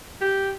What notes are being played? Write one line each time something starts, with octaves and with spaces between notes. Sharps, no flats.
G4